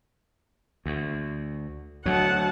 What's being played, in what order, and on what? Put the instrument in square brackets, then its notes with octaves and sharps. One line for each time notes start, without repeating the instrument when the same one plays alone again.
[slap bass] D2
[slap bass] D2 F#3 [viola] F#5 A5